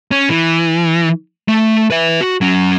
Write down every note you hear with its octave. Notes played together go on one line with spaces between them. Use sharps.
C#4
E3
A3
B4 E5
F#4
F#3 C#4